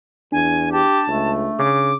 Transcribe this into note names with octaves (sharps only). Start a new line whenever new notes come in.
E2 D4 G#5
G4 A5
C#2 A3
C#3 D6